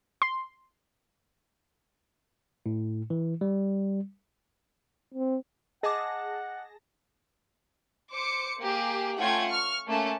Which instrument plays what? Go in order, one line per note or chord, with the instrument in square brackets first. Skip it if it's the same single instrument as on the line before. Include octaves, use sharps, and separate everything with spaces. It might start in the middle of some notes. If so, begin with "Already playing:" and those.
[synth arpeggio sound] C6
[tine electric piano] A2
E3
G3
[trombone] C4
[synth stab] G#4 A5 A#6 [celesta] D#5 D6 [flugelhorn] F#5
[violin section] C5 D6 C#7
A#3 G4 G#4
A3 C#4 F4 F#5 G5 G#6
C#6 F6
A3 A#3 C#4 A5